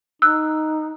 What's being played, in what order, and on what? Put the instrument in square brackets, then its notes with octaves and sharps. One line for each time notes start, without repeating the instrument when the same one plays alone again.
[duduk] D#4 [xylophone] E6 F#6